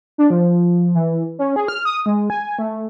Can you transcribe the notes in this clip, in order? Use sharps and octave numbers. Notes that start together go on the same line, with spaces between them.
D4
F3
E3
C#4
G#4
F6
D#6
G#3
G#5
A3